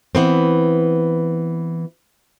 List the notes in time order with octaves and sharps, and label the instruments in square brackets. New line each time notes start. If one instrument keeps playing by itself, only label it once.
[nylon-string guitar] E3 B3 C4